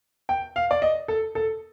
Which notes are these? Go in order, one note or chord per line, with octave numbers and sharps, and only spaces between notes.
G5
F5
D5
D#5
A4
A4